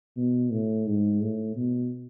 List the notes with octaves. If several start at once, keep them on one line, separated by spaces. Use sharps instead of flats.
B2
A2
G#2
A2
B2